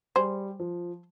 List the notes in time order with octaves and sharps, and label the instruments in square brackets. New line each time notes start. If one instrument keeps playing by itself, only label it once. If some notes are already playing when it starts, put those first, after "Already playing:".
[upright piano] G3 [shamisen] G#4 C5
[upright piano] F3